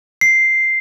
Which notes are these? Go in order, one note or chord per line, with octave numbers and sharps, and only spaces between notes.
C7